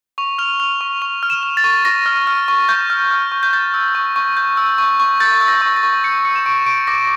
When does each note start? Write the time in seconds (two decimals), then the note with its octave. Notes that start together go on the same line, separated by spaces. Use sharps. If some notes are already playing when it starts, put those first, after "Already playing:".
0.18 C#6 F7
0.38 F6 F7
0.60 F6 F7
0.81 C#6
1.02 C#6 F7
1.23 F6
1.30 E7
1.43 F6
1.57 A6
1.64 C#6
1.85 C#6 A#6
2.06 F6
2.27 F6
2.48 C#6
2.69 C#6 G6
2.90 F6
3.11 F6
3.32 C#6
3.43 G6
3.53 G6 A6
3.74 E6
3.95 C#6
4.16 C#6
4.37 G6
4.57 E6
4.78 C#6
5.00 C#6
5.20 G6 A6
5.41 E6
5.48 A#6
5.62 C#6
5.76 A6
5.83 C#6
6.04 G6 C#7
6.25 E6 C#7
6.35 E7
6.46 C#6 D7
6.59 E7
6.66 C#6 D7
6.87 D6 A#6